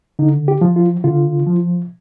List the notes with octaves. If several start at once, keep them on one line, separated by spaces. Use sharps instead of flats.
D3 D#4
G4
F3
F4
D3 F4
F3